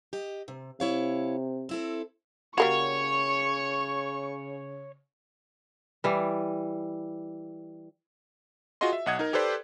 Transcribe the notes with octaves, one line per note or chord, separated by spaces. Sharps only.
G4 D#5
C3
C3 E4 C#5 F5
C4 E4 A4
C#3 G3 A#3 F#4 C#5 C#6
E3 G3
F4 F#4 G#4 D#5 C6
E5
B1 D#5 F#5 D#6 G#6
D#4 A#4
G4 A4 B4 C5 D5